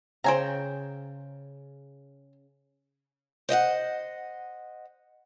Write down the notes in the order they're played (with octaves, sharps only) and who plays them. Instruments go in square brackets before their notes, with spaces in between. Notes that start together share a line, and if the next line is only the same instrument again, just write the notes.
[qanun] C#3 G5 [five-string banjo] C5 G#5 A#5
[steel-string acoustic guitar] C5 D#5 E5 F#5